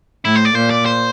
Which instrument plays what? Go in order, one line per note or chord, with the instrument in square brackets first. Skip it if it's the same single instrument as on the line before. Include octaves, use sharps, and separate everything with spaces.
[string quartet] A2 [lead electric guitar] E4
[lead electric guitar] C5
D5
[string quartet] A#2 [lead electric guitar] C5
[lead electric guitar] D5
C5